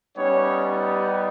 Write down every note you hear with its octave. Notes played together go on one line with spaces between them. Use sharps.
G3 B3 C#4 D#4 G4 C#5